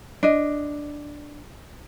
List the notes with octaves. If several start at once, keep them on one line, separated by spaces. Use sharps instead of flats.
D4 D#5